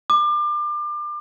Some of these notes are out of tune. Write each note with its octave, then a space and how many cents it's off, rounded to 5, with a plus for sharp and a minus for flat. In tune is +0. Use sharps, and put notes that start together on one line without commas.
D6 +30